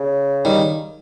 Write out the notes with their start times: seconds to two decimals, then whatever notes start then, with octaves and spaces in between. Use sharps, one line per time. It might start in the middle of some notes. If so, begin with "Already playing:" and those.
Already playing: C#3
0.45 D#3 G3